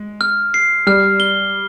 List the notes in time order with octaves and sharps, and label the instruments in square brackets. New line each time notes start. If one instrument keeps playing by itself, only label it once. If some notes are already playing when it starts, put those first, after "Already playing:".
Already playing: [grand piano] G#3
[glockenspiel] F6
C7
[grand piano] G3 [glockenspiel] F6
[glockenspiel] G7